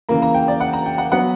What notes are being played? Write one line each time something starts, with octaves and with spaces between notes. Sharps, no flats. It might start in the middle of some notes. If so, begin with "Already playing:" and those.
C#3 E3 A#3 A#5
A#5
G5
D5
F#5
A#5
G5
F#5
F#3 B3 F#5